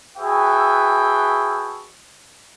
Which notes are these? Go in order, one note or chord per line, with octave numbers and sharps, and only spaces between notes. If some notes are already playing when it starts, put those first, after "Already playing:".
F#4 G#4 A4 B4 E5 G5